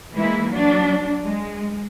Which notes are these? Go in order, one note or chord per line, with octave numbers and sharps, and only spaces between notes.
E3 G#3 A#3 E4
F#3 D4
G#3